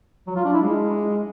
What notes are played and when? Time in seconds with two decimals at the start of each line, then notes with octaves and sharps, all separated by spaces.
0.27 F#3
0.36 F4
0.45 D4
0.53 E4
0.62 G#3